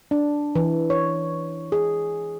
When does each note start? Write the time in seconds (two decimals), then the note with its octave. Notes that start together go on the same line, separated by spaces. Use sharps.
0.11 D4
0.55 E3
0.90 C#5
1.72 G#4